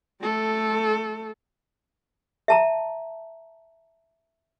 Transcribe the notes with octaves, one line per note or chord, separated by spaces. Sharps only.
A3 A4
E5 A5 A#5